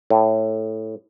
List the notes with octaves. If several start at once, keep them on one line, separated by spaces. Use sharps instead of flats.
A2